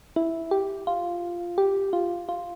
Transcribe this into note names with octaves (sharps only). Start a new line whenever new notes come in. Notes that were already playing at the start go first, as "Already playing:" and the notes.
E4
G4
F4
G4
F4
F4